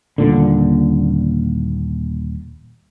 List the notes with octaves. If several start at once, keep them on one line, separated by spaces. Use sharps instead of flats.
D#1 A#2 D3